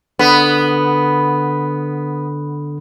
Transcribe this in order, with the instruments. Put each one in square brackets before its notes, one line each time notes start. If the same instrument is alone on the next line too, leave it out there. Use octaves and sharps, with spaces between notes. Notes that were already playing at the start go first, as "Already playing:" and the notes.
[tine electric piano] D3 D#6 [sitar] B3